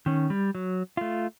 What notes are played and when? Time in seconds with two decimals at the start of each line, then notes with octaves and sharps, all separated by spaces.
0.06 D#3 C#4
0.30 G3
0.55 F#3
0.97 A3 F4